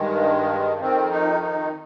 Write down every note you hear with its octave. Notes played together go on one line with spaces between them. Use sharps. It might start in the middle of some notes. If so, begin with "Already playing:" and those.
Already playing: G2 D#3 G#3
F2 D#3 C4
D#4
D#4